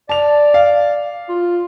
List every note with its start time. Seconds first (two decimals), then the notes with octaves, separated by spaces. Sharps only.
0.09 D5 A5 F7
0.54 F5
1.29 F4